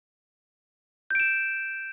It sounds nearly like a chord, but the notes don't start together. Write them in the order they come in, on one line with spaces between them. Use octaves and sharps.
G6 D7 E7